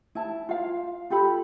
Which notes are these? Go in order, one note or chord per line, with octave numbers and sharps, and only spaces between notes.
E4 A5
F4 F5
F4 G4 A4 B5